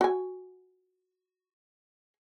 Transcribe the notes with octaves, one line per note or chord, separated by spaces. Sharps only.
F#4 G#5